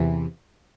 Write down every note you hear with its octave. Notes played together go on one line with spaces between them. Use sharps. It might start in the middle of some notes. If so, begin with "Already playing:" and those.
Already playing: E2 C3 E3